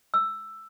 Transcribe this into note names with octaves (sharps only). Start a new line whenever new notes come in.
E6